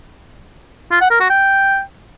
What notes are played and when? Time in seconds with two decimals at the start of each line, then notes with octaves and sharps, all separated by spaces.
0.92 F4
1.01 F#5
1.11 A#4
1.20 F#4
1.30 G5